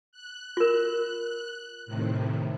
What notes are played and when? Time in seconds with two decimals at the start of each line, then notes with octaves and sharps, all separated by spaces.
0.12 F#6
0.57 F4 A#4
1.86 A2 C3 D#3